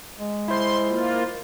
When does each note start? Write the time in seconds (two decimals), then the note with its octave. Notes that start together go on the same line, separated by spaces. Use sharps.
0.18 G#3
0.48 E4 C5 C6
0.89 A#3 F4